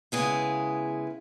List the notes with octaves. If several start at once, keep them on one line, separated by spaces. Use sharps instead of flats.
C#3 G#3 B3 E4 G#4